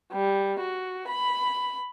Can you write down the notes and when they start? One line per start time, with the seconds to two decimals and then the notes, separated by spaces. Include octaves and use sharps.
0.12 G3
0.60 F#4
1.08 B5